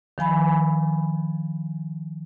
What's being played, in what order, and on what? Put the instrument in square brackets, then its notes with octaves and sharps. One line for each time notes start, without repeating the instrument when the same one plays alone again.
[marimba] D#3 F3 G#5 B5